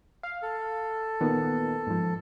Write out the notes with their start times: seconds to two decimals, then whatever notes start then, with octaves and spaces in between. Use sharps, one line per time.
0.23 F5
0.42 A4
1.21 A#2 D#3 B3
1.87 G#2 F3